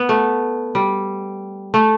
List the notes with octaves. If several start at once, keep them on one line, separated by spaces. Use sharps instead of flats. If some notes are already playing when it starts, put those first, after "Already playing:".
Already playing: B3
A3
G3
A3